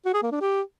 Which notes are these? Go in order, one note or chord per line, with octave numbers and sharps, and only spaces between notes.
F#4
G#4
A#3
D4
G4